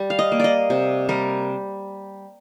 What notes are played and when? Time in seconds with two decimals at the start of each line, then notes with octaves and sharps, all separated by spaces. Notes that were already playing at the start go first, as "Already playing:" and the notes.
Already playing: G3
0.10 F5
0.19 D#5
0.32 A#3
0.40 D5 D#5
0.70 C3
1.09 G3 A#4